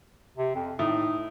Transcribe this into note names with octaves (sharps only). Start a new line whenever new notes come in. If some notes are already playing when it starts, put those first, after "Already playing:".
C3
F2
A2 D#4